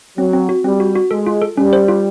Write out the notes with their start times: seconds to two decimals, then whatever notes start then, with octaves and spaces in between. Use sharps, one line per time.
0.17 F#3 C4
0.33 C4
0.49 F#4
0.64 G3 C4
0.80 F#4
0.95 F#4
1.11 G#3 A4
1.26 F4
1.42 A4
1.57 G3 C#4
1.73 C5
1.88 F4